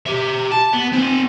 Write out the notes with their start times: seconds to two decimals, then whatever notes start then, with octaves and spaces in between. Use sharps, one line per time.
0.07 G4 E5
0.52 A5
0.73 B3
0.93 C4 G#5